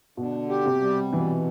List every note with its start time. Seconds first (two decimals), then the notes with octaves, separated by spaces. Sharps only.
0.17 B2 D3
0.49 G4
0.66 C3
0.82 G3
1.13 B2 E3